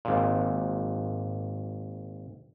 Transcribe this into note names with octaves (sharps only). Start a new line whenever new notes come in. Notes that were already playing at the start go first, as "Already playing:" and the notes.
G#1 A#2